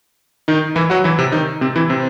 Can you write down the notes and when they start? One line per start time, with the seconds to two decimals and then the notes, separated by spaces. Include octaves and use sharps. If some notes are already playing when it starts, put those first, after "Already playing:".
0.48 D#3 D#4
0.76 E3 E4
0.90 F#3 F#4
1.04 E3 E4
1.19 C3 C4
1.32 D#3 D#4
1.61 C3 C4
1.76 E3 E4
1.89 C3 C4